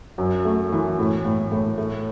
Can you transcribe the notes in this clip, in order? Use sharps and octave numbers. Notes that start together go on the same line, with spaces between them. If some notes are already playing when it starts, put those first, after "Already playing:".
F#2
A3
E3
A2
A2
A2
A3